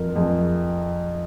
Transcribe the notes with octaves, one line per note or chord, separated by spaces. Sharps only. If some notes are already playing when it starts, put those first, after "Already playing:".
Already playing: F2 A#4
F2 G#4